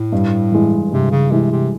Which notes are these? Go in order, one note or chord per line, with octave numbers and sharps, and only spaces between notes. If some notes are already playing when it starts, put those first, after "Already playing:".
Already playing: A2
G2
E3 G#3
G2 C3
C#3
C3 E3 G#3
C3